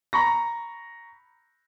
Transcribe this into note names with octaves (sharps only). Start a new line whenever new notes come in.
A#5 B5 C#6 A#6